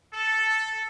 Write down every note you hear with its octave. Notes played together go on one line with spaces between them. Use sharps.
A4